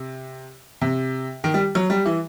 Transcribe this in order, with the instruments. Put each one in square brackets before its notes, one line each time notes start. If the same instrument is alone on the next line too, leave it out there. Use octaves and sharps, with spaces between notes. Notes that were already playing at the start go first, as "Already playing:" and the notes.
Already playing: [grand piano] C3
C3
D#3
G3
F#3
G3
E3